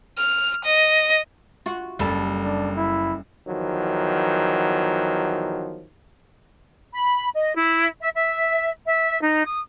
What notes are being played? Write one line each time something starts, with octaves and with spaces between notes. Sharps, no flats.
F6
D#5
F4 F#4
F#1 G3 A4
D4
E4
E2 D#3 F3 F#3
B5
D#5
E4
E5
E5
E5
D#4
D#6